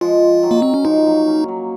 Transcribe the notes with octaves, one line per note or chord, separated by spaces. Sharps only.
F3 G#3 F4
D#3 F#3
A#3
C4
C#4
F3 G#3 D#4
F#3 A#3
A#3 C#4
F#3 A#3